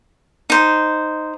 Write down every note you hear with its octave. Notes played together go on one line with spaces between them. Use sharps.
D#4 C5